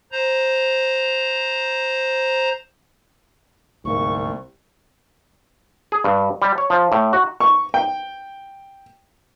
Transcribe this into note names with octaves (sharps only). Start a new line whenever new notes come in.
C5 A#5
D1 C2 G#2 A#3 C#6
G#4
G2
G3
C#5
F3
A2
F#4
C#6
G5